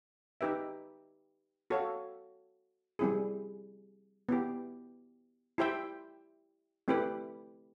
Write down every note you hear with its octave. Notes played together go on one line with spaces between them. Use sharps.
D#4 G4 B4 E5
F#4 A4 C#5 F5
G3 C4 E4 G#4
B3 E4 G4
E4 G4 C5 E5 G5
A3 C4 E4 G4 B4